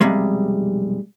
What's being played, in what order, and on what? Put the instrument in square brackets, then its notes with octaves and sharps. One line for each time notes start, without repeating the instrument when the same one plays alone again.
[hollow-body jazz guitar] B1 F2 C3 G3 G#3